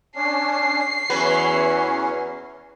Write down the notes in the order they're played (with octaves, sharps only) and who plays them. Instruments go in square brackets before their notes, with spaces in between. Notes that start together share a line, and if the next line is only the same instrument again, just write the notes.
[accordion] C#4 D4 [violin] C7
[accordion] E2 E3 C#4 [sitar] F#3 B4